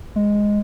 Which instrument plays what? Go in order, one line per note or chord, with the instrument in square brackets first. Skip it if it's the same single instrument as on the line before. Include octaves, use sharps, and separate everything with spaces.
[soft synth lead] G#3